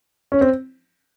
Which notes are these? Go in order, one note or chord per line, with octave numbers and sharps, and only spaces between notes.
C#4
C4